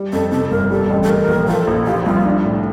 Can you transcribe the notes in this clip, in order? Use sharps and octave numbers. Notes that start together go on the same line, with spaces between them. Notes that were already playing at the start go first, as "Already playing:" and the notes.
Already playing: G3
F2 A4
C3 A4
G1 A#4
G3 A4
A1
A4
A3 A#4
A#1
F3 A4
A#1
F3 G4
C2 F4
D4
A2